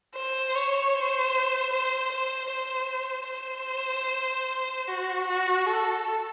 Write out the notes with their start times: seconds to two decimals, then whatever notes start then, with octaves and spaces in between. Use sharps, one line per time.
0.15 C5
0.55 C#5
0.94 C5
1.73 C5
2.12 C5
2.51 C5
3.30 C5
4.88 F#4
5.28 F#4
5.66 A4